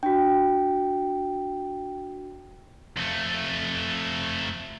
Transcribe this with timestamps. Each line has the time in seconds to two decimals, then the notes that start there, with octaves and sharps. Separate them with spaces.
0.03 D4 F#4 G5
2.97 F2 A3